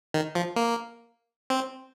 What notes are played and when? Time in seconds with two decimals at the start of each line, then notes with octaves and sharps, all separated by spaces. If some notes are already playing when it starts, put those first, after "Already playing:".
0.14 D#3
0.35 F3
0.56 A#3
1.50 C4